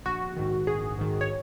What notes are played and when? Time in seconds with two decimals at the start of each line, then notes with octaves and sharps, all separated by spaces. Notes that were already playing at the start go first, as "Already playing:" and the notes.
0.06 A#1 F#4
0.37 G#2 D#3
0.67 A#1 G#4
0.98 G#2 D#3
1.21 C#5